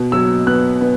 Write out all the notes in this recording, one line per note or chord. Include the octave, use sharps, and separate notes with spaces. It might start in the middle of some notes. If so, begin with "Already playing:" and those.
Already playing: B2
F#3 E6
B3 F#6
B3